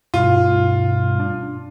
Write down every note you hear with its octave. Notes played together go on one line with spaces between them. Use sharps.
G2 B2 G3 F4
D4